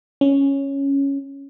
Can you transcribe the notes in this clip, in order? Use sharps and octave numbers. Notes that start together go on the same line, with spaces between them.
C#4